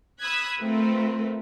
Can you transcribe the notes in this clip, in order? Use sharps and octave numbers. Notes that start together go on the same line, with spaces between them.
B5 D#6 E6 F#6 G#6 B6
A3 C4 F4 A#4 B4